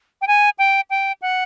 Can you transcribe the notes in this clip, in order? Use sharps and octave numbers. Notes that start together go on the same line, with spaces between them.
G5
G#5
G5
G5
F#5